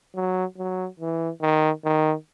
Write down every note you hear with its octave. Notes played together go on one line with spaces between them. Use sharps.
F#3
F#3
E3
D#3
D#3